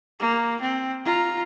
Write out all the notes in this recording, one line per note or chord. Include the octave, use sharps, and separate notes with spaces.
A#3
C4
F4 A#5